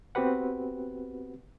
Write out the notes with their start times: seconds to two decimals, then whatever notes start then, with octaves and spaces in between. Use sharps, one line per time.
0.15 B3 C4 F#4 G4 B4 F#5